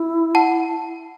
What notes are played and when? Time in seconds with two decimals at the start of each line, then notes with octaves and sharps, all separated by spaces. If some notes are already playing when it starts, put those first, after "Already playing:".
Already playing: E4
0.35 F#5 A5